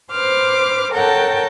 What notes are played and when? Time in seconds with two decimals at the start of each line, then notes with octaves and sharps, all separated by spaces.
0.10 B4 C5 D6 F6
0.91 A4 A#4 C#5 F#5 G5 A5